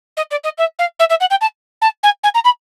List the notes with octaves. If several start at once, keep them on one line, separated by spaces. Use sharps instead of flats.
D#5
D5
D#5
E5
F5
E5
E5
F#5
G5
A5
A5
G#5
G#5
A#5
B5